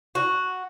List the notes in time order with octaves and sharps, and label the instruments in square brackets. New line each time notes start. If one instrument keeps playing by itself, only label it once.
[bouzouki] F#4